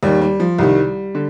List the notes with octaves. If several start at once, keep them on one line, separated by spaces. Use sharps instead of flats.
D#2 D#3 G3
G3
F3
C2 C3 D#3 G3
D3